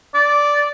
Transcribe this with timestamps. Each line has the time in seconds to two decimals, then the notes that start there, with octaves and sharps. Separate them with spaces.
0.14 D5